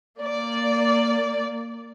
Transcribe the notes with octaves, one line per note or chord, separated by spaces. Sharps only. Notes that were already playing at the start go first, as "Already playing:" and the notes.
A#3 D5